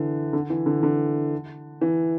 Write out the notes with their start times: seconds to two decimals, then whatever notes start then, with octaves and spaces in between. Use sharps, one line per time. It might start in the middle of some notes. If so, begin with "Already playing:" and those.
Already playing: D3 E3
0.33 D3
0.50 E3
0.66 D3
0.83 D3
1.81 E3